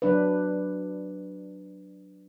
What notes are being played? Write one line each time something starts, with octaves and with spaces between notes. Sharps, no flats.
F#3 D4 B4